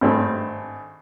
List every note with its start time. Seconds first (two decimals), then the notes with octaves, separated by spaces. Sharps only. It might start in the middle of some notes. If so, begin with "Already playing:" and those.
0.01 G#1 G2 A3 C4